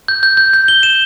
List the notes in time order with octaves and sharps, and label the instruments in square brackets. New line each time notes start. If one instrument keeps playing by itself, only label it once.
[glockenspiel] G6
G6
G6
G6
G7
E7